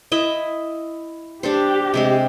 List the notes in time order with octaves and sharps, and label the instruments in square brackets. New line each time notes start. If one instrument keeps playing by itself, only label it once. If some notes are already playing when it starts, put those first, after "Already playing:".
[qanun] E4 D#5 E5
[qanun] D4 A4 C5 [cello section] G4
[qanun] C3 G#3 C4